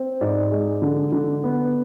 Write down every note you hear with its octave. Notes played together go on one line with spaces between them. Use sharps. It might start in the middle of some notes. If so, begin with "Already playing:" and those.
Already playing: C4
G#2 D5
G#3
D3
D3
B3